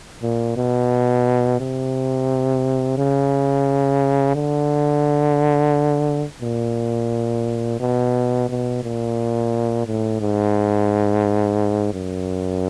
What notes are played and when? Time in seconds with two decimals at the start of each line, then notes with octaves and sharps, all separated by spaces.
0.22 A#2
0.56 B2
1.60 C3
2.98 C#3
4.35 D3
6.42 A#2
7.80 B2
8.49 B2
8.83 A#2
9.87 A2
10.21 G#2
11.93 F#2